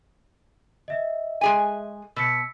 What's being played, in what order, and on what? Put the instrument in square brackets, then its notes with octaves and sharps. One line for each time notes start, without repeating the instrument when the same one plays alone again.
[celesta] D#5 E5
[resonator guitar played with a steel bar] G#3 G#4 G#5
[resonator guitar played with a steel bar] B2 [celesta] E6 B6 C#7